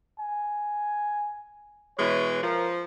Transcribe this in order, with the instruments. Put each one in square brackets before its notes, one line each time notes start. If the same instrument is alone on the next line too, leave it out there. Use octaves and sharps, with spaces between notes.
[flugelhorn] G#5
[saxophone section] B2 E3 G#3 [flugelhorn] C#5
[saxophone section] F3 [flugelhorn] A#4